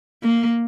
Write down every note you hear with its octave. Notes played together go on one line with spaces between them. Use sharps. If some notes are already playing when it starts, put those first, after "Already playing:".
A#3